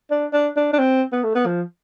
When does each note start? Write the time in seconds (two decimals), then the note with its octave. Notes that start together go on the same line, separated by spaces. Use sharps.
0.11 D4
0.33 D4
0.56 D4
0.73 D4
0.78 C4
1.12 B3
1.24 A3
1.35 B3
1.46 F3